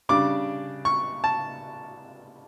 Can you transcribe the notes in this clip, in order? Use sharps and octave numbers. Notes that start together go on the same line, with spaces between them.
C#3 G3 D4 D6
C#6
A5